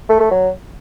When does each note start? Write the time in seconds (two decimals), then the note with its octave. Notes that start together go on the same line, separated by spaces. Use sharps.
0.09 A3
0.20 A3
0.31 F#3